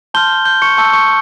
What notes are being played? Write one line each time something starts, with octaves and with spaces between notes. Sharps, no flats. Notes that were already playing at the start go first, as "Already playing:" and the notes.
A5 C6 F6 G6 G7
G6 G7
C#6 C#7
A5 C#6 E6 G6 C#7
C#6 C#7